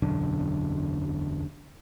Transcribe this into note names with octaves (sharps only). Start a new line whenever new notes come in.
E1 B1 F#2 D3